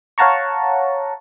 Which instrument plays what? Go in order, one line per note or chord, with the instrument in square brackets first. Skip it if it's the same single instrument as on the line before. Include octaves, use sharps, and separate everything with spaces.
[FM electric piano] C#5 F5 F#5 A5 A#5 C#6